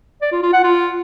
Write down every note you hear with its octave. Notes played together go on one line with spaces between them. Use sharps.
D5
F4
F4
F#5
F4